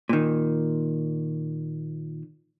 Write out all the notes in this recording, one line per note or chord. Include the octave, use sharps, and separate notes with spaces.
A#2 D#3